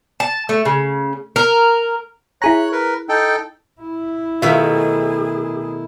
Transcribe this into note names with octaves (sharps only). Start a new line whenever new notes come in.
A5
A3
C#3
A#4
E4 G#4 C#5 A#5 F#6
A#4 B4
D#4 A4 G5
E4
B2 D#3 A3 F4 G#4 E5